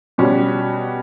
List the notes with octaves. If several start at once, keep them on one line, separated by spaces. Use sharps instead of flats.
B2 G3 C#4 F#4